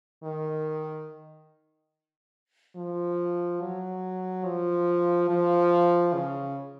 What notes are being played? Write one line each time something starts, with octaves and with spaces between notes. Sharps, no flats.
D#3
F3
F#3
F3
F3
C#3